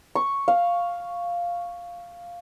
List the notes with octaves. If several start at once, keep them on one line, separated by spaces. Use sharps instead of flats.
C#6
F5